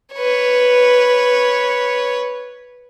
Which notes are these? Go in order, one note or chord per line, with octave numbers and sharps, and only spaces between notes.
B4 C#5